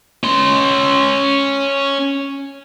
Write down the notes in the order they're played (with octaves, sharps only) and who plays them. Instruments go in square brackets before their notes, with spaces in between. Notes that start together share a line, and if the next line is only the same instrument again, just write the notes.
[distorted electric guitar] C#4 C6